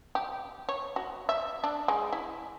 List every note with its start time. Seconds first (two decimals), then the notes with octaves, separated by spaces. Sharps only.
0.15 G4
0.69 C#5
0.96 F#4
1.29 E5
1.64 D4
1.88 G#3
2.13 E4